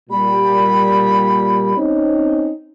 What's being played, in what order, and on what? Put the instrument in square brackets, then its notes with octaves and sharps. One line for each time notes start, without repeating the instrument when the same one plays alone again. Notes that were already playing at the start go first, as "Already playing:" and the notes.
[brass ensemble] A#2 G3 [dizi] B5
[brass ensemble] C4 C#4 D#4